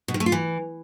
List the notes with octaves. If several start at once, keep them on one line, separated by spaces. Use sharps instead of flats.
B2
D#3
A3
F4
E3